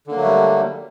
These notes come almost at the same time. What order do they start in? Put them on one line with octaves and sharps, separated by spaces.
D3 A#3 F#3 A3 G3